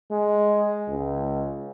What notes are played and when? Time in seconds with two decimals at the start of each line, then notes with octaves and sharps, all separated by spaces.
0.11 G#3
0.88 C#2